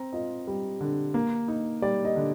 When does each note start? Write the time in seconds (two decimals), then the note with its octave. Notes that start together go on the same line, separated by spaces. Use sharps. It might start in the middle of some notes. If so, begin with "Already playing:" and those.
Already playing: C4 A#5
0.13 F4 D#5
0.47 G3
0.81 D3
1.14 A#3
1.48 D#4
1.82 G3 D5
2.05 D#5
2.16 D3